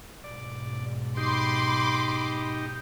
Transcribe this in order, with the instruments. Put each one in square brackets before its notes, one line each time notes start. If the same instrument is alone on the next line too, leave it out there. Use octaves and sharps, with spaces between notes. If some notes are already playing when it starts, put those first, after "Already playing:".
[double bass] B1 G#2 [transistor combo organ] D5
[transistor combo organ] D#4 G4 [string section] B5 C6 D6